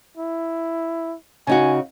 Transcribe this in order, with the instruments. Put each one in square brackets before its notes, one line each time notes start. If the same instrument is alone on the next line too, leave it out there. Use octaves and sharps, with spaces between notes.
[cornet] E4
[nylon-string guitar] C#3 D#4 F#4 [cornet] G#5